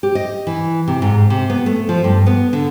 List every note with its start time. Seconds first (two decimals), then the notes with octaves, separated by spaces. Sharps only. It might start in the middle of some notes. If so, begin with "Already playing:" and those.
0.03 G4
0.15 D#5
0.47 E3
0.88 C3
1.02 G#2
1.30 C3
1.50 B3
1.66 A3
1.89 F3
2.04 G2
2.26 B3
2.53 D3